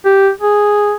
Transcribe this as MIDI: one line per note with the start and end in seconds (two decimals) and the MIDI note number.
0.05 0.30 67
0.41 0.93 68